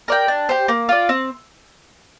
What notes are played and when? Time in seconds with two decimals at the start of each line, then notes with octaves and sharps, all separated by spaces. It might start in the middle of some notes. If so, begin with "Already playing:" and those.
0.08 A#4 D5 G5
0.28 D4
0.49 G4 C5
0.68 A#3
0.89 F4 D5
1.09 C4